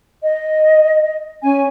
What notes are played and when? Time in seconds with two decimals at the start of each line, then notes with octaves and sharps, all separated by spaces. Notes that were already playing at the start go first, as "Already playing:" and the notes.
0.22 D#5
1.43 C#4 G#5